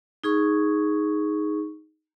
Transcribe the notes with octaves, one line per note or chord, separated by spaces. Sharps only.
D#4 G#4 C#6